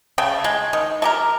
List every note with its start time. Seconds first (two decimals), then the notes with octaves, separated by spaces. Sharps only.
0.18 C#3 A3 G5
0.44 G#3
0.73 D#3
1.02 A3 G4 A#4